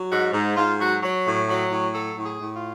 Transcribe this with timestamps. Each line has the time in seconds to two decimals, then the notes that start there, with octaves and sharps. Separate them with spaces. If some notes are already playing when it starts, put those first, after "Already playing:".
Already playing: F#3
0.10 G#2 F#4
0.33 G#2
0.56 G#2 F4
0.79 F#3 F#4
1.02 F#3
1.26 A2
1.49 F#3
1.71 A2
1.93 F#3 A4
2.16 A2
2.25 G#4
2.40 A2
2.55 F4